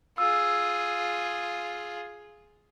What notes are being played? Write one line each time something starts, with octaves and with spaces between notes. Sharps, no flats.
F4 G#4 E6